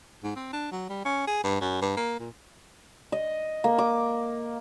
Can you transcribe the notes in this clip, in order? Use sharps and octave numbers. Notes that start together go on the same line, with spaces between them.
G#2
C4
D4
F#3
G3
C#4
G#4
G2
F#2
G2
A#3
A#2
D#5
A#3
D6